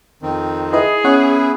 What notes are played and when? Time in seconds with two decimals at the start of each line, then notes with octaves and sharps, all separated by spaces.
0.22 F2 D#3 C4
0.73 E4 G#4 B4 D#5
1.04 B3 C#4 E4 C#5 F#5